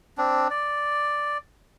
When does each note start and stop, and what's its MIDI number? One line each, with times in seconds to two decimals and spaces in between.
0.18 0.48 60
0.18 0.48 62
0.51 1.38 74